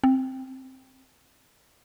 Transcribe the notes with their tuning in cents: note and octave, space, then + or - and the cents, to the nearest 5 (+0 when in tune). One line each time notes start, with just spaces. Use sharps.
C4 +5